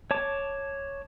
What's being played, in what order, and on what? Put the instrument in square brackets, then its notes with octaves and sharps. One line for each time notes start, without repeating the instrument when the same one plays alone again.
[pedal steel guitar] C#5 A5 D6